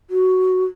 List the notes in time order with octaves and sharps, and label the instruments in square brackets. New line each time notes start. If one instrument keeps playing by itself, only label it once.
[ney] F#4